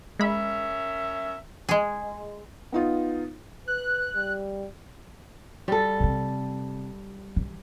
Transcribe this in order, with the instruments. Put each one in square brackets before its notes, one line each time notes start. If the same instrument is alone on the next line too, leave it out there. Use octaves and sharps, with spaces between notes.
[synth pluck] G#3 B5 [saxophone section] C#4 A#4 E5
[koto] G#3 G#4
[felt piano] B3 D#4 F4
[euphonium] B4 [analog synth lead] F#6
[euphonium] G3
[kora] G3 A4
[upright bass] C3 C4
E3